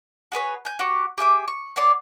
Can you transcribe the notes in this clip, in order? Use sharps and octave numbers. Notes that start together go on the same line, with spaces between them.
F#4 G#4 B4 C#5
G#5 G6
F#4 G4 C#6
G4 G#4 E5 D6
C#6
B3 C#5 D5 C6